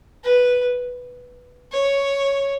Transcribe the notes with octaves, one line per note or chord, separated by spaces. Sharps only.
B4
C#5